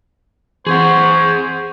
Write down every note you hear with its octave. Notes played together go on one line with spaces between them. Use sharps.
E3 C4 G#4 C5 F#5 C#6